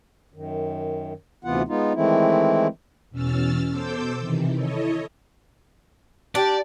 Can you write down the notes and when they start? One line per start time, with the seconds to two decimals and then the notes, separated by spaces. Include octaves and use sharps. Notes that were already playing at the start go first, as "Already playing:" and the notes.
0.34 F#2 D#3
1.45 D2 C3 E3 B3 F4 F#5
1.68 G#3 B3 D#4 F4
1.94 D#3 E3 G#3 A3 C4 E4
3.11 E2 B2 C#4 E6 F6 A6
3.69 B2 A4 C5 D6 E6 G6
4.18 C3 D#3 E3
4.56 E4 A4 C#5 D#5
6.35 D4 G4 D5